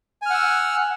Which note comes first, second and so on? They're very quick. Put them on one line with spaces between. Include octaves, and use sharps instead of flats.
G#5 F6 F#5 E6